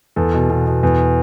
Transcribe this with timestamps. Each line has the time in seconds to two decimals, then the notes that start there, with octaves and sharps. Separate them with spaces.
0.16 E2 A4
0.34 B2
0.50 B2
0.66 B2
0.83 E2